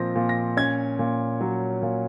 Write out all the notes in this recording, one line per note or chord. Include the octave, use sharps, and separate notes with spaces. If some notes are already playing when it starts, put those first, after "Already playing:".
Already playing: A#2 F3 C4 A#6
A#2
A#6
C#4 G#6
A#2
F#3
A#2